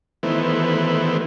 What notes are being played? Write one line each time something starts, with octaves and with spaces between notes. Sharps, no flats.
D#3 E3 A3 B3 E4 C5